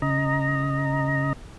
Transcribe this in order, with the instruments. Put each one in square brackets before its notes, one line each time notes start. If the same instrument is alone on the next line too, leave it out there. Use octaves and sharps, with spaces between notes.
[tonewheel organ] C#3 D#5 A#5